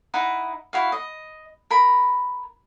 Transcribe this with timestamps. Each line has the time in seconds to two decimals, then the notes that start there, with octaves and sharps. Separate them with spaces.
0.14 D#4 E4 F#5
0.73 E4 F#4 F5
0.92 D#5
1.70 A#4 B5